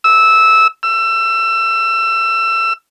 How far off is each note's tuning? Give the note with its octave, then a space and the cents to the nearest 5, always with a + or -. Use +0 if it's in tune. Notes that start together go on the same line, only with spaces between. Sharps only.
E6 -15
E6 +25